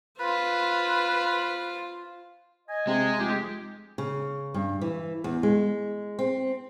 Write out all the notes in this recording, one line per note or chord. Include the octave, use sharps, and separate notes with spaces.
F4 B4 C5
D#5 G#5
C3 G#3
F1 F4 G4
C#3
G2
E3
E2
G#3
C4